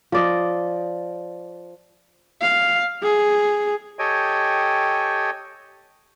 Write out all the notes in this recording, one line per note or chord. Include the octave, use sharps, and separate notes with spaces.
F3 D5 D#5
F5
G#4
G4 A4 C#5 D#5 G5 G#5